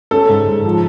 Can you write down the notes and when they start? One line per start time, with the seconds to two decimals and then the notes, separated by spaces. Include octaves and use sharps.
0.11 C#4 A4
0.29 G#2
0.47 G#2
0.65 F3